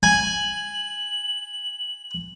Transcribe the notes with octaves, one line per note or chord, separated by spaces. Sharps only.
G#5 F#7